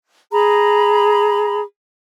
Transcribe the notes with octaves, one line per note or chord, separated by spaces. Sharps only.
G#4 A#5 B5